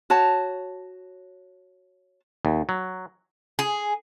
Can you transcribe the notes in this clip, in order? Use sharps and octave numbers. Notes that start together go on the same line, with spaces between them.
F#4 C#5 A5
D#2
F#3
G#4